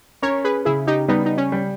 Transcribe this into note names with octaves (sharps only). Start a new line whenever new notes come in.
C#4 A#4 C#5
G#4 B4
C#3 E4 G#4
D#4 G4
G3 B3 D#4
D#4
C#4
G3